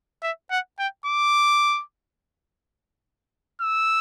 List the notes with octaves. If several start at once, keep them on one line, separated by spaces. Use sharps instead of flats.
E5
F#5
G5
D6
E6